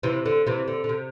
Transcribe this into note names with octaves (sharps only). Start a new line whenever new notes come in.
C3 E3
D3
C3 E3
D3
D3
C3